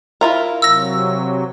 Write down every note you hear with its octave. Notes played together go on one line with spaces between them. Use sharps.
E4 F4 A#4
C3 F#3 E6 A#6